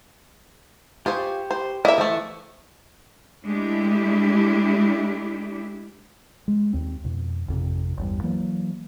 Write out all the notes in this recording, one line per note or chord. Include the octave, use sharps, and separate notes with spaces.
F4 G4 G#4 C5 C#6
C5
A#3 E4 D#5 E5
E3 F3 A3 C#6
G#3 A3 D4 E4 G4
G#3
D#2 C4
F2 B2
G#1 F2 C3
A1 E2 G2
E3 F#3 A#3